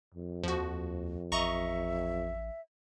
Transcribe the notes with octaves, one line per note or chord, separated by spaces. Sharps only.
F2
D#2 F3 F#4
A1 D#5 E5 A#5 C#6